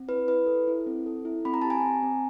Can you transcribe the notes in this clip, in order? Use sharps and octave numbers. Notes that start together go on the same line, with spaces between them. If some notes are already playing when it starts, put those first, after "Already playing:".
Already playing: C4
E4 B4
E4 B4
A4
E4
C4
A4
E4
C4 B5
A#5
G4 A5
G#5 A#5
C4
C4